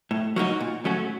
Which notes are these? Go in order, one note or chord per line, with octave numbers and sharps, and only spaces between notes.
A2
F#3 A#3 D#4 F#4
A#2
F#3 A3 C#4 F#4